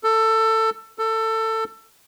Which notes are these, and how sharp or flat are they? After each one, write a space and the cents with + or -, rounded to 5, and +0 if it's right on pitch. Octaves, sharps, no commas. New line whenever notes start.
A4 +20
A4 +20